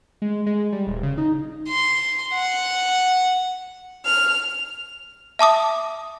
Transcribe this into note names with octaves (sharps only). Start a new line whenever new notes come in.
G#3
G#3
G3
D#1
C#3
D#4
C6
F#5
F6
E5 A5 D6 D#6